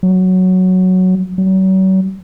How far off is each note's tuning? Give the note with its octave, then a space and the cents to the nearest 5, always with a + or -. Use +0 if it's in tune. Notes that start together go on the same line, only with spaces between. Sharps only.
F#3 +0
F#3 +40